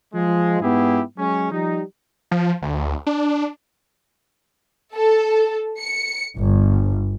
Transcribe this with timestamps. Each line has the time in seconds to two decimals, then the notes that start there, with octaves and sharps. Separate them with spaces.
0.13 F3 G#3
0.60 G#2 B3 E4 G4 G#4
1.17 F#3 G#3 C#4
1.51 F3 G3 D#4
2.31 F3
2.62 D2
3.06 D4
4.94 A4
5.79 C#7
6.37 G1